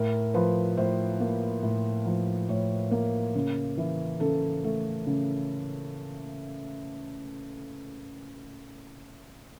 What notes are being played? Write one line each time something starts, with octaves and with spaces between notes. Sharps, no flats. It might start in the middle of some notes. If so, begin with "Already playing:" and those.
Already playing: A2 A#4
F3 B4
A2 C5
A#3
A2
F3
A2 C#5
A#3
C#3
E3
C#3 A4
A3
C#3